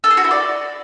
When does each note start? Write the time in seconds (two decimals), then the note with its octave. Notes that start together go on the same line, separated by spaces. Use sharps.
0.04 A4
0.11 G#4
0.17 F#4
0.24 E4
0.31 D5